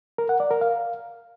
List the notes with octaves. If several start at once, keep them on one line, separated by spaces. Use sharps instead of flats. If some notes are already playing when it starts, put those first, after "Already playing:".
A#4
F#5
D5
A#4
F5